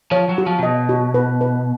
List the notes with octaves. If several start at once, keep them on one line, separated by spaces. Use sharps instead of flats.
F3 C#5
F#3
F#4
F3
C3
B2 D#5
F#4
B4
B4